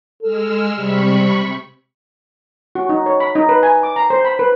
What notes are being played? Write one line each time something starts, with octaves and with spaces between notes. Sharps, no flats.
G#3 A4 E6 F6
C3 G3 B5 C#6
F#4
D#4
C#5
B5
D#4
B4
G#5
D6
A#5
C5
B5
B4